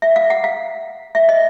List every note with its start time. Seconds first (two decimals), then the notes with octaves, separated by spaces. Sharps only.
0.02 E5
0.16 F5
0.30 F#5
0.44 F5
1.15 E5
1.29 D#5